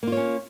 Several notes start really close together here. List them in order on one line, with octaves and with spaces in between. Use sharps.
A#3 F4 C#5 C#4